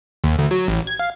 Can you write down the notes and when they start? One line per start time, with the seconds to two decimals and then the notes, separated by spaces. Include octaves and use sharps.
0.24 D#2
0.39 D2
0.51 F#3
0.68 A1
0.87 G#6
0.99 F5